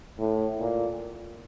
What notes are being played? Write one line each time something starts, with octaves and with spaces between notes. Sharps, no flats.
A2
A#2